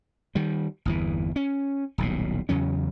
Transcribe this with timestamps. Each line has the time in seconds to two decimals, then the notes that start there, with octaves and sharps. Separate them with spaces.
0.35 D#3 G3
0.85 G1 E2 E3
1.36 C#4
1.98 D#1 B1 A2
2.49 E2 C#3 F#3 C#4